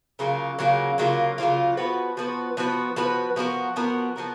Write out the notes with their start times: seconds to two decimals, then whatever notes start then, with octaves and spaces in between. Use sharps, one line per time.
0.19 C#3 F#3 A#3 F4
0.59 C#3 F#3 A#3 F4
0.98 C#3 F#3 A#3 F4
1.38 C#3 F#3 A#3 F4
1.77 F3 B3 F#4 B4
2.17 F3 B3 F#4 B4
2.57 F3 B3 F#4 B4
2.96 F3 B3 F#4 B4
3.36 F3 B3 F#4 A#4
3.76 F3 B3 F#4 A#4
4.16 F3 B3 F#4 A#4